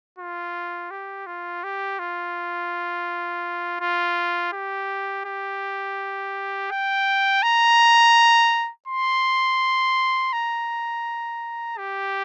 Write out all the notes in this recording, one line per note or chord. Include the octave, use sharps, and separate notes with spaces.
F4
G4
F4
G4
F4
F4
G4
G4
G5
A#5
C6
A#5
G4